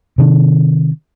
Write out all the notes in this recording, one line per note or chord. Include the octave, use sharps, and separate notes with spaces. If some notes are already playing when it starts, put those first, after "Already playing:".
C3 D#3